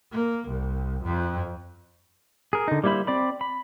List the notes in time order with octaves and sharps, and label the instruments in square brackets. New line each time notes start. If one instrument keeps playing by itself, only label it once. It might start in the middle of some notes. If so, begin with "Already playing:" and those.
[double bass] A#3
C2
F2
[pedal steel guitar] G#4 A#4
D3 D#4
G3 A#3 E4 C5 B5
C4 D5 B5
B5